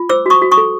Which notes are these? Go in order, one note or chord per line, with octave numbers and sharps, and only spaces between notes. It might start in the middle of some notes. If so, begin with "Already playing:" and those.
Already playing: F4
C5 D6 E6
F#4 C#6 D#6
F#4
C#6 D#6
A4